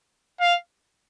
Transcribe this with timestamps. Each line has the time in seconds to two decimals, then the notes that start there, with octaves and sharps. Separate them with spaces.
0.40 F5